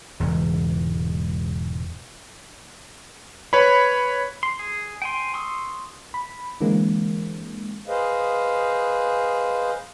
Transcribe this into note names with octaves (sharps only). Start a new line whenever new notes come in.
E1 E2 G#2 C#3
B4 C#5 B5
C6
G#4
G5 G#5 C6
C6 C#6 D#6 E6
B5
D3 E3 G#3 A#3 C4
G#4 B4 C5 D#5 F5